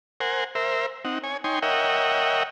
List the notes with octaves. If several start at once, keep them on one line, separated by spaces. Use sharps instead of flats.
A#4 C5 F#5 G#5
A#4 C5 E5
C4 D#4 F#5
C#5 G#5
D#4 C#5 G5 G#5 C6
A#4 C#5 D#5 E5 F#5 G5